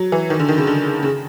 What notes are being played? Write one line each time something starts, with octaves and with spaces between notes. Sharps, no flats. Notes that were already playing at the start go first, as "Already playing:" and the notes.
Already playing: F#3
E3
D#3
D3
D#3
C#3
D3
C#3